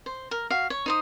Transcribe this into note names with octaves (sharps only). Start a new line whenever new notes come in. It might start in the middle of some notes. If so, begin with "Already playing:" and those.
C5
A#4
F#4 F5
C#5
D#4 C5 D#6